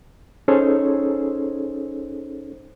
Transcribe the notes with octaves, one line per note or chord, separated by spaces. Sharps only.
C#4 D#4 G#4 A4 C5 C#5